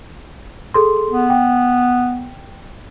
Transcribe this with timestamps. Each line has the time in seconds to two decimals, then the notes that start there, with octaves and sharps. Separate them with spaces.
0.74 G#4 A4 C6
1.11 B3
1.30 G5